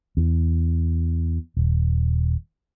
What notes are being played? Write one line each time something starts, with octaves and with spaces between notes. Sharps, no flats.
E2
D#1